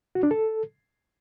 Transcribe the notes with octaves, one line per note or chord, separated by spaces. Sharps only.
F#4
D4
A4